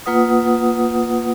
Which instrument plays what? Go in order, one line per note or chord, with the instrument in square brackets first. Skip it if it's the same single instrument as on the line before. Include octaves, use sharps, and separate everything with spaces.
[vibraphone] A#3 F4 B4 F#5 D#6